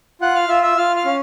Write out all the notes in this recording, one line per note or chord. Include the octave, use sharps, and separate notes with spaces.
F4 F#5 F#6
F5 F6
F4 E5 E6
E5 E6
F4 F5 F6
F5 F6
C#4